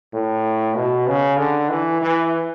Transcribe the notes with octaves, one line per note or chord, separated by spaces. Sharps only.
A2
B2
C#3
D3
E3
E3